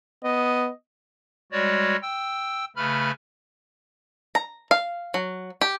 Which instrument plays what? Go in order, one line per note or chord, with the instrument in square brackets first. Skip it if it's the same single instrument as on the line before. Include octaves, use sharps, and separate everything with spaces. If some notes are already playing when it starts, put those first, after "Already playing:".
[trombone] B3 [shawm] D#5
[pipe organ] G3 G#3 F#4 C#5 D5
G5 E6
C#3 A3 B4 B5 F6
[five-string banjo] A#5
F5
F#3
G4